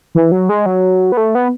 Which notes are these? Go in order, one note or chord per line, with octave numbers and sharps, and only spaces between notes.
E3
F#3
G#3
F#3
B3
A3
B3